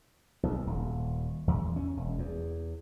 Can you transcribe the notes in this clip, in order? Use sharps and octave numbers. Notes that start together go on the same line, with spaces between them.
B1
D#1
E2
C#4
E1
E2